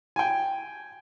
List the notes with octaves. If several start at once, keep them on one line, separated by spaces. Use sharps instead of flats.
G5 G#5